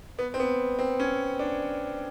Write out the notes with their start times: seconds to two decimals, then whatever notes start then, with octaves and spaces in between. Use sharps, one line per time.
0.19 B3
0.34 C4
0.40 B3
0.79 C4
1.00 C#4
1.39 D4